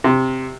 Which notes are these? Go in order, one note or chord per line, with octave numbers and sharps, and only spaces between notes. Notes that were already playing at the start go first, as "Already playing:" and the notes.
C3